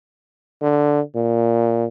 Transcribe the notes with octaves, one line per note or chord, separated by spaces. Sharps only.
D3
A#2